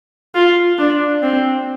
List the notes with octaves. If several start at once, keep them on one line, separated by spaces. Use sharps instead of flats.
F4
D4
C4